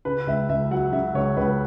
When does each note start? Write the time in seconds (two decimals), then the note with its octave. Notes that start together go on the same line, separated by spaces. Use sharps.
0.05 C#3 B4
0.27 C#2 E5
0.49 C#2 E5
0.71 F#3 F#5
0.92 C#3 E5
1.14 C#2 C#5
1.37 C#2 B4